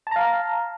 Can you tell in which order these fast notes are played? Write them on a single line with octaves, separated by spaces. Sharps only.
A5 A#5 F5